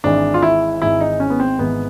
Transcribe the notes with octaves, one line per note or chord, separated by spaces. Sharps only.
G#1 G#2 E3 D4
F4
E4
G#1 G#2 E3 E4
D#4
C#4
B3
C4
G#1 G#2 E3 B3